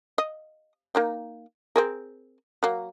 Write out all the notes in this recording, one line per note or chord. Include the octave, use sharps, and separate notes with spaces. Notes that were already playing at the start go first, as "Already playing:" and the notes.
D#5
A#3 D#4 G5
C4 G#4 A#4
F#3 A#3